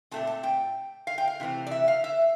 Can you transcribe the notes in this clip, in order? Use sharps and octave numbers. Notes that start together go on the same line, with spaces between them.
A#2 A3 C4 A5
A5
G5
F5
G5
F5
C3 E3 A3 C4
D5
E5
F5
E5